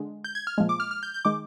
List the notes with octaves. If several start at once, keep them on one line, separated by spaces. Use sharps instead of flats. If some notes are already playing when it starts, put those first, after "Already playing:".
Already playing: D3 G#3
G6
G#6
F6
A#2 F3 G#3
D6
F6
F6
G6
G6
D#3 G#3 D6